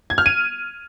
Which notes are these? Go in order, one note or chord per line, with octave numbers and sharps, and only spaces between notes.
G#6
F6
D#7